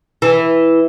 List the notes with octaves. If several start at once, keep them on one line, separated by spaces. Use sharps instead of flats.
E3